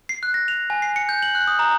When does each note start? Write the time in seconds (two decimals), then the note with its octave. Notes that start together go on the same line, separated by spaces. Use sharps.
0.09 C7
0.23 F#6
0.34 A#6
0.48 F7
0.70 G#5
0.82 C7
0.96 C#7
1.09 G6
1.23 F#7
1.35 F#6
1.47 D#6
1.59 A#5